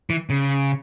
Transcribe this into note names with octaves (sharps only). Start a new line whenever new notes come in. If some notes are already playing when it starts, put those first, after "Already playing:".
E3
C#3